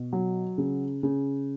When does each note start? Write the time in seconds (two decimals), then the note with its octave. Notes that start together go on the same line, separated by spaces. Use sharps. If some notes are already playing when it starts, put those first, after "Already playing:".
Already playing: B2
0.13 F#3
0.58 C#3
1.03 C#3